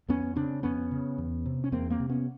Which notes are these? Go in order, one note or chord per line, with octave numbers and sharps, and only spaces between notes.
F2 B3 C#4
C#3 C4 D4
F2 B3 C#4
C#3
E2
C3
C#4
E2 A#3 C4
A#3 C4
C3
B3 C#4